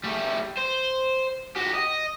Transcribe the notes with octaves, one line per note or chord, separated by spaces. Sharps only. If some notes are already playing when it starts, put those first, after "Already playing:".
G3 A3
C5
F#4 G4
D#5